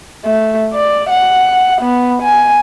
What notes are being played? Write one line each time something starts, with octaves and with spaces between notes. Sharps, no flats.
A3
D5
F#5
B3
G#5